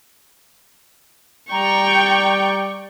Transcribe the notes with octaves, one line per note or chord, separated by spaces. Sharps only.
G3 D5 G5 A#5 C#6